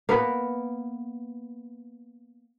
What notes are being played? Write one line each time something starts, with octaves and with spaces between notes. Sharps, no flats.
A#3 B3 A#4 B4